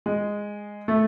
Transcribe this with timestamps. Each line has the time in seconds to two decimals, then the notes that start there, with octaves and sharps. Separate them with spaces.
0.06 G#3
0.88 A3